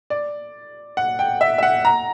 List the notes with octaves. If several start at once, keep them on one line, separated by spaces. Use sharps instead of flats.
D5
F#5
G5
E5
E5
F#5
A#5